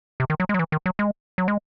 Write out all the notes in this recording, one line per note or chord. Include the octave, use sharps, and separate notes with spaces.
C3
D#3
F#3
G#3
F#3
E3
D#3
F#3
G#3
F#3
G#3